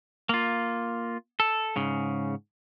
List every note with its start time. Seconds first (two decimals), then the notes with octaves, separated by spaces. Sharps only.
0.29 A#3 F4
1.40 A4
1.76 G#2 C#3